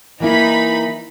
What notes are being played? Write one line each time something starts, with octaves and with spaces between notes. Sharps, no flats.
E3 A#3 D#4 E4 B5